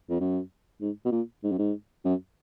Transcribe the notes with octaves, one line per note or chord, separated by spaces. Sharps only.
F2
F#2
G#2
B2
A#2
G#2
F#2
G#2
F#2